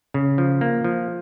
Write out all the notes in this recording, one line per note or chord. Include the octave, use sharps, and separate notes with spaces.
C#3
F3
A#3
F3